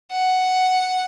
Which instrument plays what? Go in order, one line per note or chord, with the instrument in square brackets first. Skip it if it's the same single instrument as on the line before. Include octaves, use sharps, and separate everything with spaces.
[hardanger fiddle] F#5